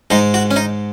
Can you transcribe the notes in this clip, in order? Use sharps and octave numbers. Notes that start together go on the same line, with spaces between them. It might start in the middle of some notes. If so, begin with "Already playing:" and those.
G#2 G#3 D#4
F#4
C#4
D#4